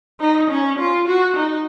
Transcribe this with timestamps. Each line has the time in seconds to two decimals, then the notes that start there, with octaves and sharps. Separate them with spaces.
0.20 D#4
0.50 C#4
0.79 F4
1.08 F#4
1.36 D#4